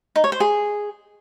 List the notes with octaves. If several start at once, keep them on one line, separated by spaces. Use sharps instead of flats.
D#4
C#5
C5
G#4